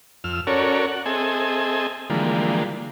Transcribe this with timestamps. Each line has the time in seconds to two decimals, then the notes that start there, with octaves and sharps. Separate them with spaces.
0.24 F2 E6 F6
0.47 C#4 F#4 A4 A#4 C#5 D5
0.88 F#5
1.06 C4 G#4 A4 D#5 E5 G#5
2.10 D3 E3 F3 G3 G#3 A#3